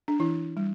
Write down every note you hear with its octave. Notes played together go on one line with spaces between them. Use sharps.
D4
E3 E4
G3